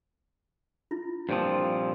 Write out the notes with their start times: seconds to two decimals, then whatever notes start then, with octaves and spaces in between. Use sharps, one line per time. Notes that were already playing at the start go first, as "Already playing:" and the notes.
0.91 E4 F4
1.29 G2 A#2 F3 C4 C5